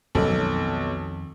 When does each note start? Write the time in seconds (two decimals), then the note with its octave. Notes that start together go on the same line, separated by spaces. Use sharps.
0.15 B1 F2 D#3 G#3 A4